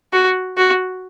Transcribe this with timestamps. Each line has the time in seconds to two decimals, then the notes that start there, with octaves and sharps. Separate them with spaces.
0.13 F#4
0.57 F#4